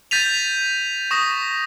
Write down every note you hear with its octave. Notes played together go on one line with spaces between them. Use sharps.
G6 A6 B6 D#7 F7
C#6 D#6 A#6